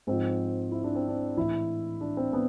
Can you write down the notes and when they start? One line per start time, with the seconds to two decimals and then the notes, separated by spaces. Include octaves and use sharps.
0.07 G#2 F3 C4
0.72 E4
0.84 D4
0.95 C4
1.08 D4
1.37 A2 E3 E4
2.01 D4
2.17 C4
2.33 B3